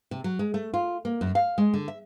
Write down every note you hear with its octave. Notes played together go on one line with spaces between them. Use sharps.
C3
F#3
G#3
A3
F4
A#3
F#2
F5
G#3
D3
E5